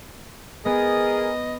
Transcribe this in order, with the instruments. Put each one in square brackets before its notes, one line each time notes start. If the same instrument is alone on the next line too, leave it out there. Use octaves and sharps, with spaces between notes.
[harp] B3 [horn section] G#4 A#4 [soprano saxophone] D#5